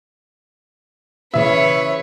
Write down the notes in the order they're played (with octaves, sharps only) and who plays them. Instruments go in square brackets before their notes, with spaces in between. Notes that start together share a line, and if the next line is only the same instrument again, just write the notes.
[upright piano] C#3 E3 [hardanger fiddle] B4 C#5 [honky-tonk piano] E5